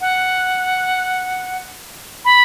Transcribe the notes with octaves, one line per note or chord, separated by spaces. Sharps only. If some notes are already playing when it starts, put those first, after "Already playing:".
F#5
B5